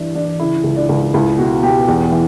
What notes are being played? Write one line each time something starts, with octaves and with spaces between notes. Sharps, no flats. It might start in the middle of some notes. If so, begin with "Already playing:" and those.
Already playing: G2 E3 D4
E3 D4
C#3 E4
C#2
D4
C#2
C#2 E4
B2 F#4
B2 G4
E2
E3